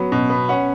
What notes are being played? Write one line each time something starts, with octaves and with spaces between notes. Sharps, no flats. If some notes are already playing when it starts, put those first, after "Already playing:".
Already playing: F#3 B3
B2
B3
C#4 F#5